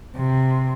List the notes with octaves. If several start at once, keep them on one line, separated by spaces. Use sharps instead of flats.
C3